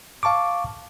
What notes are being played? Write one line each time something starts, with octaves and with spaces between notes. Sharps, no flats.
F5 A5 C#6 D6